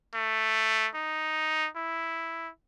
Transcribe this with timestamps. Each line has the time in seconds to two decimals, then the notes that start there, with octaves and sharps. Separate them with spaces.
0.15 A3
0.95 D#4
1.76 E4